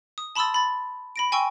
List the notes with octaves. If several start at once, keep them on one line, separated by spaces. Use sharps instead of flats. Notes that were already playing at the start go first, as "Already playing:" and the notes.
D#6
A5 B5 C6 D#6 E6 A6
B5 A6
B5 A#6 D7
G5 G#5 C6 C#6 E6